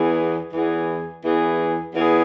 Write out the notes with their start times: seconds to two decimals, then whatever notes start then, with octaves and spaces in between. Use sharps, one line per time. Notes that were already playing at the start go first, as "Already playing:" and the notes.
Already playing: E2 E3 B3 G#4
0.53 E2 E3 B3 G#4
1.24 E2 E3 B3 G#4
1.95 E2 E3 B3 G#4